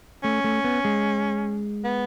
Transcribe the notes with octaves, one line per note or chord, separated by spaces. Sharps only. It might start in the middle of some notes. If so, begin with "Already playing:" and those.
A3 C#4
A3
B3
G#3
B3